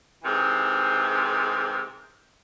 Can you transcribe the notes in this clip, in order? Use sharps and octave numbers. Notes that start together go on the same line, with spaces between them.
G#2 C3 E3 A#4